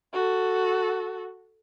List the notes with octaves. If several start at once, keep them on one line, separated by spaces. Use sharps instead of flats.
F#4 A4